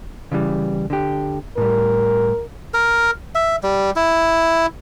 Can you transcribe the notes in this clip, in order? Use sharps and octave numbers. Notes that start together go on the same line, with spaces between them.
C#3 E3 G3
D3 G4
A2 G3 A#4
A#4
E5
G3
E4